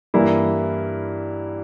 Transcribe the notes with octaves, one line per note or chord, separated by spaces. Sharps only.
G2 E3 A#3 E4